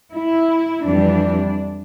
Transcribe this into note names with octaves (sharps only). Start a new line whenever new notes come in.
E4
F2 E3 G3 D4